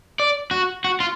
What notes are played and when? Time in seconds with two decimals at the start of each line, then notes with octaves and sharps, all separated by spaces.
0.20 D5
0.51 F#4
0.84 F#4
1.00 F4